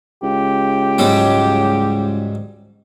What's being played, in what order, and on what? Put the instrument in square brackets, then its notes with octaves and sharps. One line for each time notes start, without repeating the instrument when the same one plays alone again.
[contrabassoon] C#2 [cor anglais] G4
[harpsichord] G#2 F#3 G3